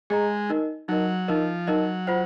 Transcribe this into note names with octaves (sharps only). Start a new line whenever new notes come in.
G#3 G#4 D#5 A#5
D#4 A#4 D#5
F#3 D#4 A#4 D#5
F3 D#4 A#4 D#5
F#3 D#4 A#4 D#5
F4 C5 F#5